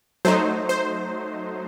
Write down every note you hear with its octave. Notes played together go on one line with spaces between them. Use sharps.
F#3 A3 D#4 C5
C5